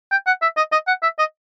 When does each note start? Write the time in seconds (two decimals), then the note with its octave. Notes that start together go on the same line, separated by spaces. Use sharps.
0.11 G5
0.27 F#5
0.42 E5
0.57 D#5
0.72 D#5
0.88 F#5
1.03 E5
1.19 D#5